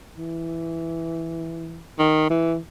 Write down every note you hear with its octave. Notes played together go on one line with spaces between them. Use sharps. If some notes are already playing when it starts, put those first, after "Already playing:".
E3
D#3
E3